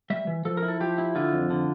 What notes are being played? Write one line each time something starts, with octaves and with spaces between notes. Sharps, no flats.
G3 E5
E3
F3 A4
A#4
E4
A4
F3 G4
E4
D3 F4
F2
D3